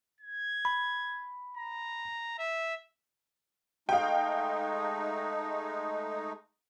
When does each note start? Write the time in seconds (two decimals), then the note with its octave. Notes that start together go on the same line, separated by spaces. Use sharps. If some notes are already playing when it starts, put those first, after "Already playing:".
0.21 G#6
0.65 B5
1.57 A#5
2.39 E5
3.89 G#3 A3 D#4 F5 G5